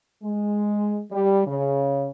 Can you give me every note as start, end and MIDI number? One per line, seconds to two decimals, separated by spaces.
0.23 1.02 56
1.11 1.42 55
1.47 2.10 49